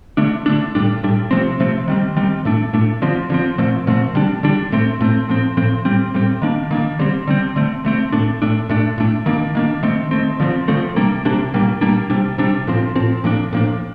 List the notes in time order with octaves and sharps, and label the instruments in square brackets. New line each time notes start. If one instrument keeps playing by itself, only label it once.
[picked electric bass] D3 A3 D4
D3 A3 D4
A2 G3 D4
A2 G3 D4
C3 F3 A3 C4
C3 F3 A3 C4
D#3 G3 C4
D#3 G3 C4
A2 A3 D4
A2 A3 D4
D3 F3 C4
D3 F3 C4
A#2 F3 A3 C4
A#2 F3 A3 C4
D3 G3 D4
D3 G3 D4
A2 A3 C4
A2 A3 C4
A2 F3 C4
A2 F3 C4
A2 G3 C4
A2 G3 C4
D#3 A#3 D4
D#3 A#3 D4
D3 G3 C4
D3 G3 C4
D3 A3 C4
D3 A3 C4
A2 A3 D4
A2 A3 D4
A2 A3 D4
A2 A3 D4
D#3 A#3 D4
D#3 A#3 D4
D#3 A3 C4
D#3 A3 C4
D3 F3 A3 C4
D3 F3 A3 C4
C3 G3 A#3 D4
C3 G3 A#3 D4
A#2 G3 A#3 D4
A#2 G3 A#3 D4
C3 G3 D4
C3 G3 D4
A2 F3 C4
A2 F3 C4
A2 F3 A#3 D4
A2 F3 A#3 D4